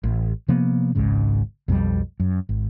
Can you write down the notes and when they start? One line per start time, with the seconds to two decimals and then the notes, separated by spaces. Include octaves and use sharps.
0.04 A1
0.48 C3 F3 A#3 B3
0.95 G#1 C#2 G#2 C#3
1.68 B1 F2 E3 G3
2.20 F#2
2.49 G#1